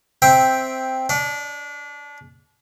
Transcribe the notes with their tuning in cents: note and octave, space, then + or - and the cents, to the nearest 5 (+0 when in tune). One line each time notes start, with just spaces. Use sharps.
C4 +0 E5 +0 G5 +0
D4 -25 D5 +45